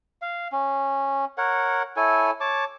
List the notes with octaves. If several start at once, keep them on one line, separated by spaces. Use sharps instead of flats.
F5
C#4
A#4 C#5 F#5
E4 A4 C#5 G#5
C#5 A5 D6